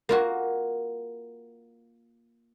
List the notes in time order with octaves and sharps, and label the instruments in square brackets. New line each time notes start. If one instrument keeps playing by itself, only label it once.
[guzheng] A#3 F4 F#4